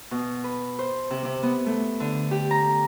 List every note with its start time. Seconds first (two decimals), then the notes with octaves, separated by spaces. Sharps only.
0.11 B2
0.44 B4
0.79 C5
1.10 C3
1.25 C3
1.43 B3
1.66 A3
2.00 D3
2.31 G4
2.51 A#5